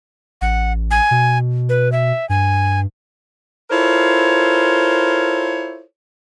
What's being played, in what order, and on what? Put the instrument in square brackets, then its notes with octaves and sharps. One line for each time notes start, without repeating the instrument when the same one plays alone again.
[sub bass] A1 [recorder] F#5
[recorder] G#5
[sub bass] B2
[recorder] B4
E5
[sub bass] G2 [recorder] G#5
[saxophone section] E4 F4 A4 A#4 C5 C#5